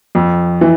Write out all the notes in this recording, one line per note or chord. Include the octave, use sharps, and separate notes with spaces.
F2
E3